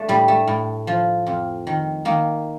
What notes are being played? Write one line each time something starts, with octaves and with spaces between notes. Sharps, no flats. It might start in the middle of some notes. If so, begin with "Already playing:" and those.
Already playing: A3 D4
A2 G3
A3
A2
F3
F2
D#3
D#3 A#3